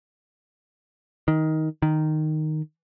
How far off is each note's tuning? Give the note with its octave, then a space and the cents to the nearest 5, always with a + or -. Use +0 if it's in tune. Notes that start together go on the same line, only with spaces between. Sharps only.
D#3 +15
D#3 -5